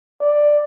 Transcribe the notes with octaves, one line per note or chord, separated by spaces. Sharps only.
D5